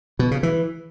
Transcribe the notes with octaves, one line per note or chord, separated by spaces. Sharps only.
B2
C#3
E3